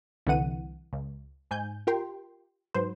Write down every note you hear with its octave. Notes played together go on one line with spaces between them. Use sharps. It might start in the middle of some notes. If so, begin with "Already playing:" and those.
C2 D3 E3 F#5 D#7
C#2
G#2 G#5 G6
F4 G4 A#4 G5 C6
G#2 F#3 B4 C5